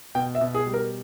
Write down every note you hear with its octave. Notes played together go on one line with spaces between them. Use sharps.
B2 G5
E5
B2
G#4
G3
A#4